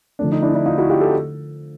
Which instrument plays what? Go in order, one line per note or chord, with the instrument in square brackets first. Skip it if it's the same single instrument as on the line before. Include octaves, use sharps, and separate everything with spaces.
[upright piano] D3 F3 A3 [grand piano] D4
[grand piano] D#4
D4 E4
D4 E4
D#4 F4
E4 F#4
F4 G4
G4 A4